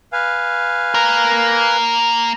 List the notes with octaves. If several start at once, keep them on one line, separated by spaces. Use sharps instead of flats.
B4 F5 G#5
A#3 A#4